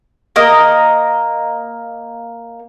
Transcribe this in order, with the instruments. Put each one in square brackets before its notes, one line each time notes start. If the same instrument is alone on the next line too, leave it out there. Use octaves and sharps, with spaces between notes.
[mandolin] A#3 A#4 D#5